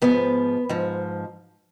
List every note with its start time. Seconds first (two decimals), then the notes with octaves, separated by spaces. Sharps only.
0.02 G#2 F3 B3
0.69 G#2 F3